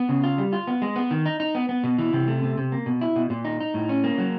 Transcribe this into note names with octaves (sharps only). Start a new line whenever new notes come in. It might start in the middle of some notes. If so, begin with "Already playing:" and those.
Already playing: B3
C#3
F4
G3
F4
B3
G#3
B3
D#3
D#4
D#4
B3
B3
B2
E3
C3
A3
C3
C3
A#3
B2
E4
B2
A#2
D#4
D#4
A2
C#4
A#3
F#3